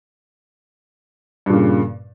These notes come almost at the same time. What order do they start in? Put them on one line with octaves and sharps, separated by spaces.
G2 A#2 C#3